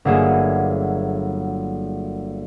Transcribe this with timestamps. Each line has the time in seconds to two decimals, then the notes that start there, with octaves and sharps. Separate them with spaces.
0.05 G1 F#3 A#3 G#4 E5